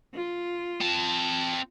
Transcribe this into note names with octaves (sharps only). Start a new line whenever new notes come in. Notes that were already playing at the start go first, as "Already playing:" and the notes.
F4
C4 A5